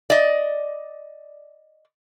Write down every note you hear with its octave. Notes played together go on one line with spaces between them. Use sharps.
D5 D#5